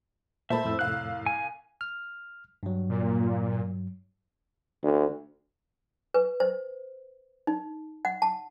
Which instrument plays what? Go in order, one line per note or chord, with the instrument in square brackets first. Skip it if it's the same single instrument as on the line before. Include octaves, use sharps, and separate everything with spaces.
[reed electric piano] A#2 A3 [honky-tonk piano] C5 A5 B5 [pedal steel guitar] E5
[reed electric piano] F2 A2 E6
[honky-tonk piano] C2 F5 [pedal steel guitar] F#6
[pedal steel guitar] G#5
[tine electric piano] F6
G2 F#3
[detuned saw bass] A#2
[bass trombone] D2
[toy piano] B4
C5
D#4
F#5
A5